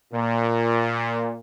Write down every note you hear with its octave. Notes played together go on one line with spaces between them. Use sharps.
A#2